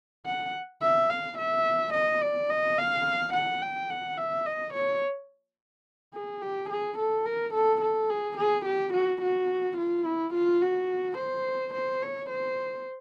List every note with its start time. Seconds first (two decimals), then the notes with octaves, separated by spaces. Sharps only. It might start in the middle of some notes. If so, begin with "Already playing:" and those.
0.26 F#5
0.82 E5
1.10 F5
1.38 E5
1.94 D#5
2.22 D5
2.50 D#5
2.78 F5
3.34 F#5
3.62 G5
3.90 F#5
4.18 E5
4.46 D#5
4.74 C#5
6.14 G#4
6.42 G4
6.70 G#4
6.98 A4
7.26 A#4
7.54 A4
7.82 A4
8.10 G#4
8.37 G#4
8.66 G4
8.94 F#4
9.22 F#4
9.78 F4
10.06 E4
10.34 F4
10.62 F#4
11.18 C5
11.74 C5
12.02 C#5
12.30 C5